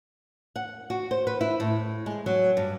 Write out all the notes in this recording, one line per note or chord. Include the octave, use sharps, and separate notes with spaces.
F#5
F#4
C5
B4
E4
A2
G#3
F#3
G2